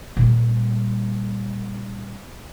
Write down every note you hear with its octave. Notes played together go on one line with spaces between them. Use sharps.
A#2 G3